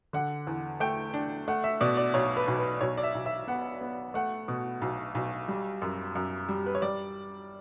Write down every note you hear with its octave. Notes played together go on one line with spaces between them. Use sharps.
D3 F#5
E2
A3 G5
D4
A3 F#5
E5
B2 D5
D5
B1 C#5
B4
B1
B4
B1 C#5
D5
E5
B1
E5
B3 F#5
B3
A3 F#5
B2
B1
B1
G3
F#2
F#2
G3
B4
C#5
G3 D5